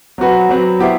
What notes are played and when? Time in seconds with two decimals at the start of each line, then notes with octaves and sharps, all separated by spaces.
0.18 F#3 C4 F#4 B4
0.49 F#3 C4 F#4 B4
0.79 B3 E4 G4 C5 E5